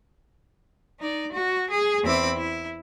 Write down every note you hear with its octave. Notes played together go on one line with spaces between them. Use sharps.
D#4 D5
F#4
G#4
E2 C4 E4 B5 D6
E4